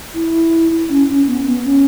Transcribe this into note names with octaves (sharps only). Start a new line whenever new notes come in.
E4
C#4
C#4
B3
B3
C#4